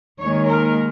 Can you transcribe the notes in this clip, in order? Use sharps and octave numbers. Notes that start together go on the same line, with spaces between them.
D#2 D#3 G#3 C#5
A#4